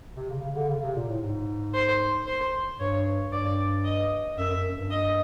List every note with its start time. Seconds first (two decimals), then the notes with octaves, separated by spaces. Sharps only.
0.17 C3
0.30 C#3
0.42 C#3
0.56 D3
0.69 C#3
0.83 C3
0.96 A#2
1.08 A2
1.22 G#2
1.74 C5
2.27 C5
2.80 G2 C#5
3.33 G2 D5
3.85 D#5
4.38 F#2 E5
4.55 F#2
4.73 G2
4.91 D#5